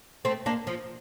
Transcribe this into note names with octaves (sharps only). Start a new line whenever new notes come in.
A3 C4
A#3 D4
F3